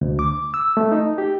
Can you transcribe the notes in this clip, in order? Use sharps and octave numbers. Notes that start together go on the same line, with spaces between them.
D2
D6
E6
A3
D#4
G4